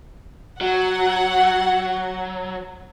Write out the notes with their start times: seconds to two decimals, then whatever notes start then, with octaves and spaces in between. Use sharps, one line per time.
0.61 F#3 F#5